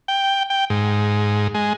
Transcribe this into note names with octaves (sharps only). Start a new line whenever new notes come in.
G5
G5
G#2
G#3